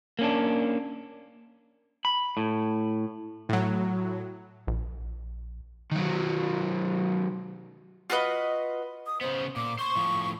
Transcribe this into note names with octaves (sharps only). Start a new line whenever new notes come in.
A#3 C#4 D4
B5
A2
A2 F#3
A#1
D#3 F#3
F4 F#4 B4 D#5
D#6
C#3 B3 C5
A#2 D6
C5 C6 C#6
A2 F3